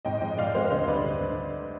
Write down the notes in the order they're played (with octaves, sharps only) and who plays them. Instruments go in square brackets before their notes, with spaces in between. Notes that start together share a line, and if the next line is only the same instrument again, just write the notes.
[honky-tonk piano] G#2 D#5 G5
F3 G#3 D#5 G5
G#2 D5 F5
F3 G#3 C5 D#5
D2 C5 D#5
D3 G3 B4 D5
D2
D3